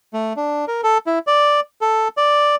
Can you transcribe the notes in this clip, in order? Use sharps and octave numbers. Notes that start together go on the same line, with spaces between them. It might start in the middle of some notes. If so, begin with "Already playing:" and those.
A3
D4
A#4
A4
E4
D5
A4
D5